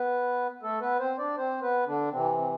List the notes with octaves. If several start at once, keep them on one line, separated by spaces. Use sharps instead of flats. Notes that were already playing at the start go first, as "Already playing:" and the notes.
Already playing: B3 B4
A3 A4
B3 B4
C4 C5
D4 D5
C4 C5
B3 B4
D3 D4
C3 E3 C4
C4